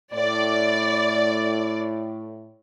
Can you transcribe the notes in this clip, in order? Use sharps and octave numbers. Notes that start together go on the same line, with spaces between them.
A2 D5